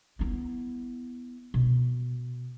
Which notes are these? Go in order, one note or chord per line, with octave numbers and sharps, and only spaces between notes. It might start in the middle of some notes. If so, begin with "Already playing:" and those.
B3 E4
B2